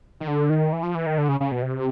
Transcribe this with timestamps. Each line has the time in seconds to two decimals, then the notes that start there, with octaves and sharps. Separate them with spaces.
0.20 D#3
0.28 D3
0.50 D#3
0.73 E3
0.83 F3
0.95 E3
1.06 D#3
1.18 D3
1.29 C#3
1.40 C#3
1.52 B2
1.62 C3